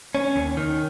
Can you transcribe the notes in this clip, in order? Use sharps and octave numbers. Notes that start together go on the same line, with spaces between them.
C#4
D#2
D#3